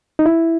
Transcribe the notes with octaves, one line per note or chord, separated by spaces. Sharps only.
D#4
E4